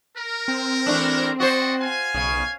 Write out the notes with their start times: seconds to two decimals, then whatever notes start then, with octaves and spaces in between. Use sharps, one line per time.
0.17 A#4
0.48 C4
0.86 E3 A3 D4
1.40 F#4 C5 D5 D#5 C#6
1.82 F5 G#5
2.14 B1 C#3